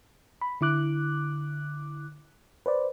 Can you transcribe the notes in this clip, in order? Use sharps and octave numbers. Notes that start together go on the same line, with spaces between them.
B5
D3 E4 D6 F#6
B4 C5 D5